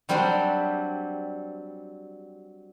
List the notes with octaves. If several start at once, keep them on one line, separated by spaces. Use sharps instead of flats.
F#3 G3 C4 D4 G4